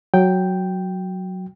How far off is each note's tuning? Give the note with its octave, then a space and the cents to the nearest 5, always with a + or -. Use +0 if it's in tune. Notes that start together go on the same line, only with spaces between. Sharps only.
F#3 +0 G5 +0